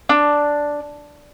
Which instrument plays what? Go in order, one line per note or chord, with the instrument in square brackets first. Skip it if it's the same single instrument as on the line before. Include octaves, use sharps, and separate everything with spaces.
[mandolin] D4